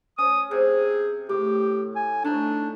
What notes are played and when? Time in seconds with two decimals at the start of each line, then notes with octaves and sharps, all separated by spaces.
0.18 C#4 D#6
0.51 C3 G#4
1.29 A2 G4
1.96 G#5
2.24 A3 D4 D#4